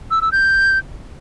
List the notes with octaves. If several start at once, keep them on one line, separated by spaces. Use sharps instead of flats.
E6
E6
G6